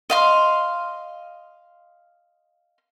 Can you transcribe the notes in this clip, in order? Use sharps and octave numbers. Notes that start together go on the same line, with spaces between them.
D#5 F5 C6